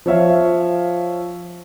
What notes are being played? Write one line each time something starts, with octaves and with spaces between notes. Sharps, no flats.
F3 C#5 E5 F5